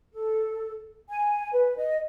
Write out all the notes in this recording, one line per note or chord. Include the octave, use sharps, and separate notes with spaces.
A4
G#5
B4
D#5